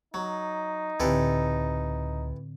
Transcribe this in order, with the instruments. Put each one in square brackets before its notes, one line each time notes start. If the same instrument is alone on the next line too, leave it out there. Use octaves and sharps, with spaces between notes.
[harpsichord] F#3 [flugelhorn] D#4
[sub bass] C#2 [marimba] A2 D3 C4 [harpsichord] E3 G4 A4